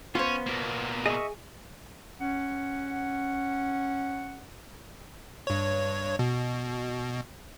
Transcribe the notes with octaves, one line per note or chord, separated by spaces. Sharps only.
B3 C#4 F4 C5 C#5
B2 A#3
G#4 D#5 E5 C#6
C#4 F#5
G2 C#5
B2